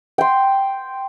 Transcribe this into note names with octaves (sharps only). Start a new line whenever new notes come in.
G5 C6